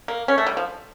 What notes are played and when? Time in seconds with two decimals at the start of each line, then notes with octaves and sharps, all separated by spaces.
0.08 A#3
0.28 C#4
0.38 A3
0.47 G3
0.57 F3